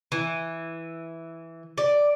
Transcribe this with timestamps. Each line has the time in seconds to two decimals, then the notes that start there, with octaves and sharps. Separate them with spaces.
0.12 E3
1.78 D5